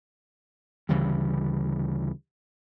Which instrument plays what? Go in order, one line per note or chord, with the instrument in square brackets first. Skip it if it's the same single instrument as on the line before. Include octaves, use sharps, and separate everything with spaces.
[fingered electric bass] D2 C#3 E3 G3